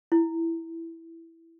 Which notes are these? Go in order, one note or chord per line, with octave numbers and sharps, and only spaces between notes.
E4